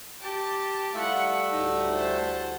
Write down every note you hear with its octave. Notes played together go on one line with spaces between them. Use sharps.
G4 A5
G3 A3 E4 F4 E5 F#5
D2 A2 D#4 F#5
C5 A5